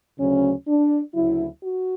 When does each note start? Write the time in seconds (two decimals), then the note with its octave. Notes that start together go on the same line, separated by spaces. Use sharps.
0.19 D2 C#3 F#3 C#4
0.67 D4
1.13 D2 C#3 F#3 E4
1.62 F#4